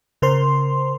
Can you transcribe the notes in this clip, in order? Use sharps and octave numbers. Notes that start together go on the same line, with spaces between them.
C#3 A#4 C5 C6